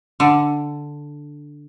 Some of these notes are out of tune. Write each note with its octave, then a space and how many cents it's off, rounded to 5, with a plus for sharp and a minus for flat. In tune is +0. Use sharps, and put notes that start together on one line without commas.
D3 +0